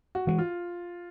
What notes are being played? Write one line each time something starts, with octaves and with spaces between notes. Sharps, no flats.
F#4
E3 G#3 F#4
F4